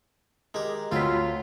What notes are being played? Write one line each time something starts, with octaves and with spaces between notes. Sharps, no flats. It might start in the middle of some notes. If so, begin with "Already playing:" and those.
G#3 G4 A#4
D2 C4 F4 F#4 C#5 B5 B6